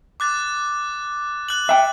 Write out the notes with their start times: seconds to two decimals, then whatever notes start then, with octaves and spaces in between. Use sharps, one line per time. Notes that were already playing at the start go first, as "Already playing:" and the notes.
0.20 D6 F#6 A6
1.48 F#6 F#7
1.69 E5 G5